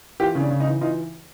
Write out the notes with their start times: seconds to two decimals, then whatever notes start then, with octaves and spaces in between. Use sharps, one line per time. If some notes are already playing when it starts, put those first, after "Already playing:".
0.20 E3 F4 G4
0.35 C#3
0.40 D4
0.50 C#3
0.60 D#4
0.66 E3
0.81 E3 D#4 F4